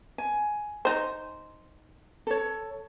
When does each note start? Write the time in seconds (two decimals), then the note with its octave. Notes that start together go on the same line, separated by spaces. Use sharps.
0.18 G#5
0.85 D#4 C5
2.27 A4 C#5